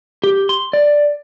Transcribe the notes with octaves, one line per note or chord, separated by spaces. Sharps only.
G4
C6
D5